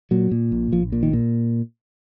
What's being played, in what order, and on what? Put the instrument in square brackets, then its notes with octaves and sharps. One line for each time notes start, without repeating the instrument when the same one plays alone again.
[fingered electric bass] A#2 F#3
A#2
A#1
A#1 F3
A#2
D#3
A#2